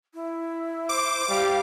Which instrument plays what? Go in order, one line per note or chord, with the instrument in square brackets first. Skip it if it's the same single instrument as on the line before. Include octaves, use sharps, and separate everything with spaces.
[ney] E4
[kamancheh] C5 [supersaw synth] D6
[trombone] G3 [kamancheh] G4 F5